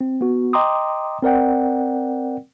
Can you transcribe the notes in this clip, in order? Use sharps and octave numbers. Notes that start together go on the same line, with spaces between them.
C4
B3 F#4
D#5 G5 A#5 C6 D6 D#6
C4 A#4 D5 F#5 G5